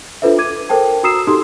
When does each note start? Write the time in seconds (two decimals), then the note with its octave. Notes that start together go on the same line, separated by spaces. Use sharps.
0.22 D4 F4 A4 B4 C5 E5
0.38 D6 G#6 D#7
0.69 A4 A#4 C5 G5 A5
1.03 F#4 A#5 D#6 E6 C7 E7
1.27 D#4 G4 A4 C6 D#6